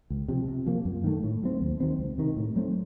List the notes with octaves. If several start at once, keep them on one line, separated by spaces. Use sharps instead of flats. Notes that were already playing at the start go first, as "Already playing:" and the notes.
C#2
C3 F3
C3
F3 A#3
F#2
D#3 A3
A2
F#3 A3 C4
D#2
D#3 F#3 C4
C#2
C3 D#3
A2
F#3 A3 C4